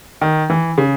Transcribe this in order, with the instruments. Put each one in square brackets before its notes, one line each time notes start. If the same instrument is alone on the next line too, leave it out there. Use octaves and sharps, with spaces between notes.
[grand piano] D#3
E3
C#3